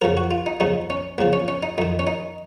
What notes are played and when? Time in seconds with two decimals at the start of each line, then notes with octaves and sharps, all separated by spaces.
0.01 F2 C#3 F3 A#4
0.17 F#4
0.31 F4
0.46 D#4
0.60 D#2 C#3 F3 D#4
0.90 C#4
1.18 C#2 C#3 F3 A#3
1.33 C#4
1.48 C#4
1.63 D#4
1.78 F2 D#3 D#4
1.99 C#4
2.07 D#4